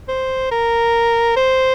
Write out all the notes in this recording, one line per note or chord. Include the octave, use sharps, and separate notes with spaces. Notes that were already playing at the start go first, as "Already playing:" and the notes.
C5
A#4
C5